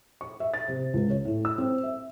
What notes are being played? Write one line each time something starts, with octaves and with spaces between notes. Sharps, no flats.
C#6
E5
A6
C3
C#2
C#5
A2
E6
C4
E5